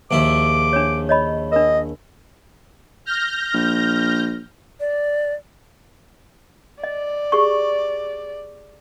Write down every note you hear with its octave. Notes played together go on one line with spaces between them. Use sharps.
A#1 D#2 E4 D6
D4 C#5
C#5 D#5 B5
D4 A#4 D#5
F6 G6 A#6
A#1
D5
D5 D#5
G4 G#4 C#6